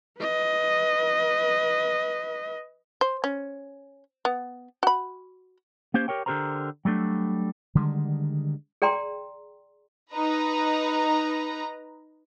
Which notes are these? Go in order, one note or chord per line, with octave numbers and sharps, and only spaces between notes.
B4 D#5
C5
C#4
B3
F#4 B5
A#3 C#4 G4 C5
G4 A#4 C#5 G5
D3 F#4 G4 A#4 C5 A#5
F#3 G3 A3 D4
D3 D#3 G3 G#3
G#4 D5 G5 A#5 C6
D#4 B4 A#5